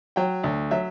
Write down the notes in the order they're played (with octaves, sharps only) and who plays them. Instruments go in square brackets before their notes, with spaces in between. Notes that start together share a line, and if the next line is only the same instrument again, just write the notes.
[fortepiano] F#3 G5
D2
F#3 E5